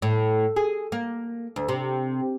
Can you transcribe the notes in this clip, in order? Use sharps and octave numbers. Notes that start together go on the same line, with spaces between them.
A2
G#4
A#3
D2
C3